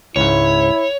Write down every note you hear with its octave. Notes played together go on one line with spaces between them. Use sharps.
C#2 G#2 E4 C#5